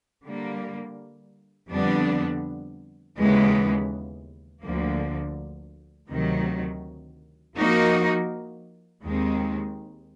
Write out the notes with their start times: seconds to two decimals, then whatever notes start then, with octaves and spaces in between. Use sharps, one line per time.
0.24 D3 G3 A#3
1.70 F2 D3 G3 B3 D4
3.17 D#2 C#3 E3 G#3 B3
4.63 D2 D3 F3 A#3
6.09 D2 C3 D#3 F#3
7.56 F3 A#3 D#4 F#4 A#4
9.02 D#2 D#3 G#3 C4